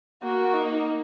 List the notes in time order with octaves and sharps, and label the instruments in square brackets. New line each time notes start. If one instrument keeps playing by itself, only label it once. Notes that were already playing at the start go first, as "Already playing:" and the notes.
[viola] A#3 [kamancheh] F#4
[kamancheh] D#4